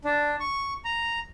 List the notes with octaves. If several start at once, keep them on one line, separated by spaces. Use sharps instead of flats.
D4
C#6
A#5